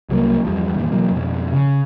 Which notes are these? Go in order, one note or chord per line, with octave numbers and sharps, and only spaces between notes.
C2 F#3 G3 A#3
E2 G2 F3
E2 A#2 D#3
B2 E3 F#3 A#3
F2 B2
C#3